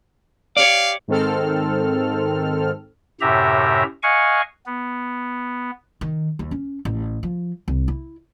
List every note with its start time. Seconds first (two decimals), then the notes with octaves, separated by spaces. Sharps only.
0.57 G4 C#5 D5 F5
1.08 G#2 D#3 C4 A4 F6
3.21 F#2 A2 C3 G4 E5 A#5
4.03 D#5 F5 F#5 G#5 C#6
4.66 B3
6.01 D#3
6.39 D#2
6.51 C#4
6.85 A1
7.23 F3
7.68 C2
7.88 E4